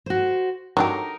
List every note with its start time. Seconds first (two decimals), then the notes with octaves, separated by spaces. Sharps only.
0.06 F#4 C5
0.77 F#3 D4 D#4 G4 A#4